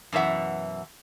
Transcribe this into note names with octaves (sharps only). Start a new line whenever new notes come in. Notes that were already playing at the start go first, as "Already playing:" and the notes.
F#2 B2 E3 E5 F#5